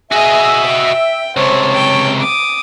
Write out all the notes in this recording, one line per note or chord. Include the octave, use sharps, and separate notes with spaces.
F#4 G#4 D#5 E5
G5
C#2 C3 C5 C#5 A5 C#6
G5
D6 D#6